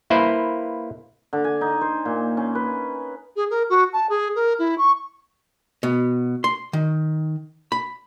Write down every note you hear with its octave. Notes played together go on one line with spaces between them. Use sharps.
A#3 E4 B4 C5
D3
G#5
D#4
C5
A#2
C#4
B4
G#4
A#4
F#4
A5
G#4
A#4
E4
C#6
B2
C6
D#3
B5